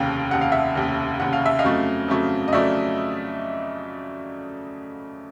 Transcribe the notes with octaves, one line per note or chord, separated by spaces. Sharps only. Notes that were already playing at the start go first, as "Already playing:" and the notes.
Already playing: F1 D#2 C#3 F5 G5
F1 D#2 C#3 F#5
F5
E5 F#5
F1 D#2 C#3
F1 D#2 C#3 F#5
F5
E5
D#5 F5
F2 C#3 F#3 A3
F2 C#3 F#3 A3
D#5
F2 C#3 F#3 A3 D5 E5